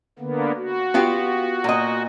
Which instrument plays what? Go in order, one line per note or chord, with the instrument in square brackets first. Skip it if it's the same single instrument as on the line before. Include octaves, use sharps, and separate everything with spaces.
[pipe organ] D3 A#3 B3
F#4
[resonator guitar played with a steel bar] B3 F4 G4
A#2 D#5